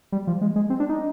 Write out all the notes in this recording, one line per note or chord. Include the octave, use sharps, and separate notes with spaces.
G3
F3
G#3
G#3
C4
D4
D#4